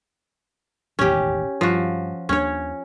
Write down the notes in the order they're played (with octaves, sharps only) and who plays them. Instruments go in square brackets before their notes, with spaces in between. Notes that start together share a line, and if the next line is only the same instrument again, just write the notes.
[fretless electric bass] E1 A1 D#2 [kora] C#4 G4
[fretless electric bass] G2 [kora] F3 F#4
[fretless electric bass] D#2 D4 [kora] C#4 C#5